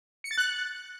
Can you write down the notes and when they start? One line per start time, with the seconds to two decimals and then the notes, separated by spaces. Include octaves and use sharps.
0.24 C#7
0.31 A6
0.38 F#6